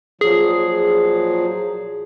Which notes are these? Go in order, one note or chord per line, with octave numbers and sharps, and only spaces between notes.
A#2 F3 F#3 G#4